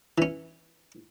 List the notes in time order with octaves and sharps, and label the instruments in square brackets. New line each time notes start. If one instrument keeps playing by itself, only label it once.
[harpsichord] E3 C#4